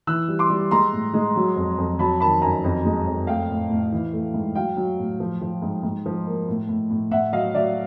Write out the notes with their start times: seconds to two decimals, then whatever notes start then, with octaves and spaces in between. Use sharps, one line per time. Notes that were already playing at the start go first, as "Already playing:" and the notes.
0.07 E3 E6 F#6
0.28 G3
0.39 C6 D6
0.50 G3
0.71 G#3 A#5 C6
0.93 A2
1.14 G#3
1.36 F#3
1.56 F2
1.78 F2
1.99 F#3 A5 B5
2.20 D#3 A5 B5
2.42 F#2 G#5 A#5
2.64 F2
2.85 G#3
3.07 F2
3.27 A3 F5 G5
3.49 A2
3.70 A2
3.92 E3
4.13 A3
4.34 G#2
4.55 F#3 F5 G5
4.77 F#3
4.99 A2
5.20 F3
5.42 F3
5.62 G#2
5.83 G#2
6.06 F3
6.27 A#3
6.48 A2
6.69 A2
6.91 A2
7.11 A2 E5 F#5
7.33 F#3 D#5 F5
7.54 F#3 D5 E5